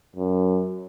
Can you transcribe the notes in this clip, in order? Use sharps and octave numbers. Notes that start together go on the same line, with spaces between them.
F#2